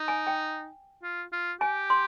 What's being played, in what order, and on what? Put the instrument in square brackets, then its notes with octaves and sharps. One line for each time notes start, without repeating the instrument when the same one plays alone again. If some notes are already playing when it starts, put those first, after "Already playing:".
Already playing: [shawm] D#4
[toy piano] G#5
G5
[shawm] F4
F4
[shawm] G4 [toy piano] G#5
[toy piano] C6